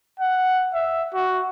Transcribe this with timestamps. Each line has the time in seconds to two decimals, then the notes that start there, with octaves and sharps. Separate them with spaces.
0.20 F#5
0.74 E5
1.14 F#4